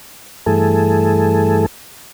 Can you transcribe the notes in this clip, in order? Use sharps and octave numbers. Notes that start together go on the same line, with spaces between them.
G2 E3 A3 G#4 A4